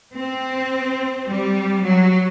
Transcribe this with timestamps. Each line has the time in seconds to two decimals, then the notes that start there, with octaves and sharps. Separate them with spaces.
0.14 C4
1.26 G3
1.83 F#3